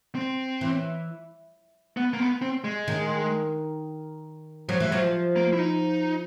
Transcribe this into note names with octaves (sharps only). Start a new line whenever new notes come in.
C4
E3
B3
A#3
B3
C4
G#3
D#3
F3 F#3
E3
F3 F#3
A#3
E4
D#4